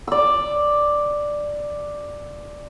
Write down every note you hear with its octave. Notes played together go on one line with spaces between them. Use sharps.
D5 E6